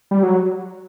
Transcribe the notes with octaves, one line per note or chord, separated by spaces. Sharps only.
G3
F#3